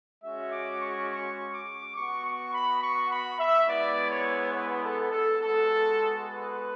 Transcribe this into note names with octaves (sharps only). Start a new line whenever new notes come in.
G#3 C#4 F#4 E5
D6
C#6
C#6
D6
B3 F#4 C#6
C#6
B5
C#6
B5
E5
G#3 B3 E4 D5
C#5
B4
A4
A4
G#3 B3 F#4 A4
B4